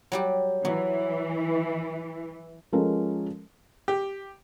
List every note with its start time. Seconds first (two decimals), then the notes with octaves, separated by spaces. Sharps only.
0.12 F#3 G3 G4
0.65 E3 F#3
2.72 F3 G#3 C#4 A4 A#4
3.88 G4